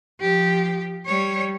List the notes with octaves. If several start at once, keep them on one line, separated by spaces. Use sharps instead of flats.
F3 G4
G3 C#5